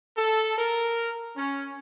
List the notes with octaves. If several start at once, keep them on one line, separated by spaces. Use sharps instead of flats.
A4
A#4
C#4